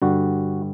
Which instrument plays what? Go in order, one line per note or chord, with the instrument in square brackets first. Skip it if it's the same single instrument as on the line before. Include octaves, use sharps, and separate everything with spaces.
[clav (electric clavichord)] G2 D3 G3 F#4